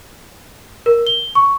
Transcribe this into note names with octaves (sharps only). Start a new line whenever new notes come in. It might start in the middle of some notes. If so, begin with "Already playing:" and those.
A#4
G7
C#6